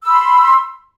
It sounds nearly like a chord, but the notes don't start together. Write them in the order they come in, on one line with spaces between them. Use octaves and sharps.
E6 B5 C6